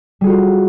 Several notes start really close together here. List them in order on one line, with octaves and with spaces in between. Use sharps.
G3 G#4 F#4 F4